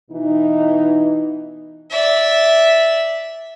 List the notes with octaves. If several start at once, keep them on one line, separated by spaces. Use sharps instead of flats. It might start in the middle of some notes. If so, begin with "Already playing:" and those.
B2 E3 D#4
D5 E5